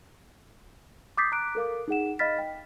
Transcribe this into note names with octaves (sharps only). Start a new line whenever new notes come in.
D6 D#6 G6 A6 B6 C7
A#5 D6 F#6 D7
A4 A#4 F5 D6
D#4 G#4 F#5 E7
D#5 F5 B5 F6 A6 B6
G5